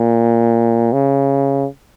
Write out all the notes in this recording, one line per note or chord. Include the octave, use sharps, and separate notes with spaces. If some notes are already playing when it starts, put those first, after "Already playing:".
Already playing: A#2
C#3